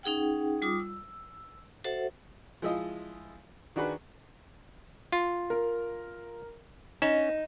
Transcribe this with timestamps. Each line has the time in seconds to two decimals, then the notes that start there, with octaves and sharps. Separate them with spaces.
0.03 C#4 D#4 G#4 F#5 G5
0.62 G3 F4 D6 D#6
0.80 E6
1.84 F#4 A4 C5 E5 F#5
2.62 F3 G#3 E4 F4 D#5
3.76 D#3 D4 F#4 G#4 B4
5.12 F4
5.50 A#4
7.02 C#4 D#4 E7